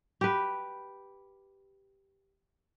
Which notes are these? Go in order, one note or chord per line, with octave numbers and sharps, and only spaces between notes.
G4 B4